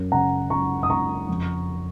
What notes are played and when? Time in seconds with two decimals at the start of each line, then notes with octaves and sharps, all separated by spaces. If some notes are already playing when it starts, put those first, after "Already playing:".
Already playing: F#2
0.12 C#3 F#5 A#5
0.50 F#2 A#5 C#6
0.83 D#6
0.89 C#3 A#5 C#6
1.29 F2